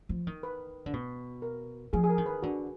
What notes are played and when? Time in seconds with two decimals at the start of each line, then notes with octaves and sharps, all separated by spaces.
0.09 F3
0.27 D#3
0.43 B4
0.86 D3
0.93 B2
1.42 A#4
1.93 F3 G#4
2.04 G#4
2.09 A#4
2.18 D#3
2.26 B4
2.42 D3 F#4